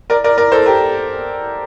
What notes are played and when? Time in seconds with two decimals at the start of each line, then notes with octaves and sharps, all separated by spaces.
0.10 A#4 D5
0.24 A#4 D5
0.38 A#4 D5
0.52 A4 C5
0.66 G4 A#4